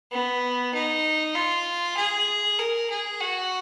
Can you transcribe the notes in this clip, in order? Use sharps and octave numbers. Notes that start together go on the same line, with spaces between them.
B3
D#4
F4
G#4
A#4
G#4
F#4